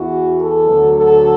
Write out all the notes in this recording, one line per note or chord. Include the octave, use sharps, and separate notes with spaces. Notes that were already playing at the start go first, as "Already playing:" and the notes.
Already playing: E2 E3 F#4
A4
D2 D3 F#3
A4